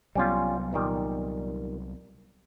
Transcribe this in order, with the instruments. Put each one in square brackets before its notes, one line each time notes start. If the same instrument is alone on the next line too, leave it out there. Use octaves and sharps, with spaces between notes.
[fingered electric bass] C2 F#3 B3 [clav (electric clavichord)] G3 C#4 F4
[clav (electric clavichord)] A#2 D#3 G3